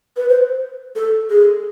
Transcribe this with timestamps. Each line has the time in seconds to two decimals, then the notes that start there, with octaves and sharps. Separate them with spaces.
0.17 B4
0.29 C5
0.96 A4
1.30 G#4